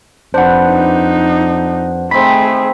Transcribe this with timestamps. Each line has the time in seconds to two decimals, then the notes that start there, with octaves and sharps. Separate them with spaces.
0.34 F2 D4 B4 C5 F#5
0.67 D#4
2.11 D#3 A3 C4 G#4 B5 B6